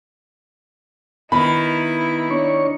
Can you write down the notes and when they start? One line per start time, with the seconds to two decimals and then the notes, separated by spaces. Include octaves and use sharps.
1.32 D#3 B3 E4 B5
2.31 D4 C#5 C#6